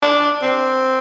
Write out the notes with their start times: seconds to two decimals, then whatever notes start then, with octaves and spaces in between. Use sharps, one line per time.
0.02 D4
0.42 C4